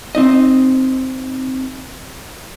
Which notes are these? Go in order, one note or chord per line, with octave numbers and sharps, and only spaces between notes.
C4 D#4 D#5